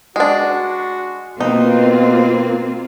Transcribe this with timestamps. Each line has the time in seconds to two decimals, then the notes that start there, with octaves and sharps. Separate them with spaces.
0.16 G#3 D4 F#4
1.41 B2 A#3 C4 D#4 F4 B4